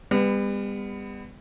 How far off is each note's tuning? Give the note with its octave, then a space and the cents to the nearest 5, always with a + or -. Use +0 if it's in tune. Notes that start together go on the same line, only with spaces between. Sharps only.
G3 +40 B3 +15